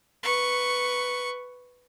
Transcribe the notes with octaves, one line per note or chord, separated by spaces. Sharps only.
B4 C#6